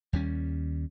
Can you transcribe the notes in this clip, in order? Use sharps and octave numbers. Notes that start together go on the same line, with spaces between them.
D#2 G3 C#4